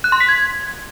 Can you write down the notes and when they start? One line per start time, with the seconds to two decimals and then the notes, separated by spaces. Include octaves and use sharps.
0.04 F#6
0.12 C6
0.20 B6
0.29 G#6